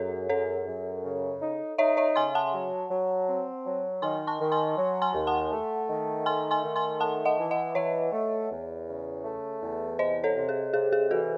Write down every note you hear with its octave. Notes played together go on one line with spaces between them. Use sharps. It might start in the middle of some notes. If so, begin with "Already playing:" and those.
Already playing: F#2 G#4 A4 C#5
F#2 A4 C#5
F#2
C#3
D#4
D#4 C#5 E5
C#5 E5
C#3 G#5 C6
F#5 A5
F#3
F#3
C4
F#3
D#3 G#5 C6
A5 C#6
D#3
G#5 C6
F#3
G#5 C6
D#2
F#5 A5
A3
D#3
A3 G#5 C6
G#5 C6
D#3
G#5 C6
A3 F#5 A5
D#5 F#5
E3
D#5 F#5
E3 C#5 E5
A3
E2
C#3
A3
E2
C3 C5 D#5
A4 C#5
C3
G#4
C3 G#4
G#4
E3 F#4 A4